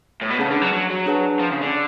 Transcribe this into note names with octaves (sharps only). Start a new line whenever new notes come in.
A2
B2
C#3 G#4 B4 F#5 A5
D3
F#3
F#3
F#3
D4 G#4 B4 F#5 A5
F3
C#3
D3